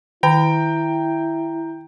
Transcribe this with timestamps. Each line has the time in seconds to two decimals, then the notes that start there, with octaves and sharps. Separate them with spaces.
0.23 D#3 E4 G5 A#5